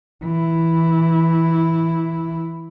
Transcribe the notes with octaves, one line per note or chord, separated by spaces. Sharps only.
E3 E4